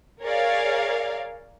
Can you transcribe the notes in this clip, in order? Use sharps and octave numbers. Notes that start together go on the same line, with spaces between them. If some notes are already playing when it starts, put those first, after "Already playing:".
G#4 A#4 C#5 D5 F5